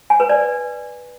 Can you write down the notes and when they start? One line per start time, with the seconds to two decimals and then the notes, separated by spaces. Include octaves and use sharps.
0.10 G#5
0.20 B4
0.29 D5